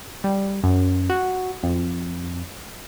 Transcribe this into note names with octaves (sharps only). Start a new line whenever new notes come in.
G3
F#2
F#4
F2